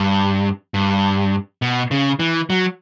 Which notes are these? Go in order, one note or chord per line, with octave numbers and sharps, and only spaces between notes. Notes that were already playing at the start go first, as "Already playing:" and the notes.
Already playing: G2
G2
B2
C#3
E3
F#3